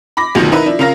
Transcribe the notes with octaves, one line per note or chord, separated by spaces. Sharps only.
B5 D6 A#6
F#1 D2 B2 D#3 F3
D#4 E4 A#4 B4
F3 D4 E4
C#3 C#4 F4 A#4 F5 A#6